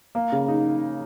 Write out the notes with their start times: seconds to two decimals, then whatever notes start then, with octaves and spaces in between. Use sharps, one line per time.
0.15 A#3
0.32 C#3
0.48 D#4